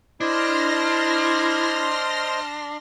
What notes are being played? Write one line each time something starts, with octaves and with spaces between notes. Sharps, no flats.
D4 E4 C5 D#5 C6 F6 A#6